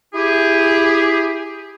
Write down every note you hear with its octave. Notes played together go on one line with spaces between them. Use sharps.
E4 G4 G#4